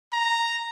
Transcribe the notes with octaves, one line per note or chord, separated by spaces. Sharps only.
A#5